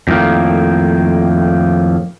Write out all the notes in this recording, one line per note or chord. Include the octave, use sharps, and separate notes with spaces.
F2 A2 D#3 A#3